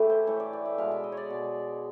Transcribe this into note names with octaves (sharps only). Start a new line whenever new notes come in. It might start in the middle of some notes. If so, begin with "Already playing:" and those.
Already playing: A2 E3 A3 E4 G4
C5
A2 E3 A3 C#5
D5
D5
E5
B2 G#3 F5
E5
D#5
C#5 D5
B2 G#3